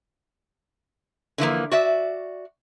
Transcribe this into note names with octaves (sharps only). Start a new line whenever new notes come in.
D3 E3 F3 A#3
F#4 D5 E5